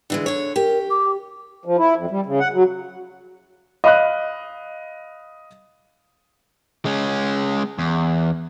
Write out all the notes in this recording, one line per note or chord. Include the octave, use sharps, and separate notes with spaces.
D3 E3 G#3
D3 C#5
G4 A#4
D6
F3
E4
F2
G3
C#3
F#5
F#3
D#5 F5 B5 D#6 F#6
G#3 C#4
E2